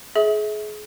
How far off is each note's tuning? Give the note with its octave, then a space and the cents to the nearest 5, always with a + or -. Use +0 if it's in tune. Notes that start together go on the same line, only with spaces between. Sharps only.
G#4 +30 E5 -30